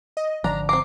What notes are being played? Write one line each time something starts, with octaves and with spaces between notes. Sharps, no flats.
D#5
G#1 D3 F3 D4 A#5
C4 A#5 D6 C7